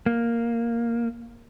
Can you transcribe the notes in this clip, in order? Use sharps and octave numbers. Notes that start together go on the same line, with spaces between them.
A#3